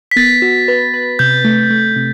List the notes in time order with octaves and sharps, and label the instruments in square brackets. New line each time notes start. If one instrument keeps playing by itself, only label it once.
[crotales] B6
[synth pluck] B3 [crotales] A6
[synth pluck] F#4
B4
B4
[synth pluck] C3 [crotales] G6
[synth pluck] A3
A3
C3